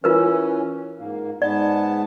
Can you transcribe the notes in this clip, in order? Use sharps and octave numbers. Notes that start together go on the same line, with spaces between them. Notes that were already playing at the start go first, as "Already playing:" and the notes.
E3 C#4 F4 A#4 B4
G#2 A#3
G#2 B3 D5 A5